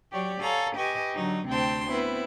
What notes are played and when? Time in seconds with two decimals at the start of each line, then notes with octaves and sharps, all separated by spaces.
0.12 F#3 G4 C#5 D5
0.41 A4 C#5 F5 G#5 A#5
0.77 G4 B4 D#5 G#5 C#6
1.15 D3 F#3 D#4
1.48 D2 C3 C4 G5 A5 C6
1.90 B3 C4 E4 B4